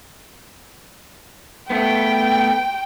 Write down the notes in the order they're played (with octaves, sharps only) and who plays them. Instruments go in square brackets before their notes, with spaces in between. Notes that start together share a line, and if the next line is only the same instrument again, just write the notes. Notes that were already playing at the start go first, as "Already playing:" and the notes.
[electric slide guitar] A3 B3 [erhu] G5